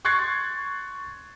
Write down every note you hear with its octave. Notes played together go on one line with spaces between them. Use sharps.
C6 C#6 F#6 G#6 A6 C7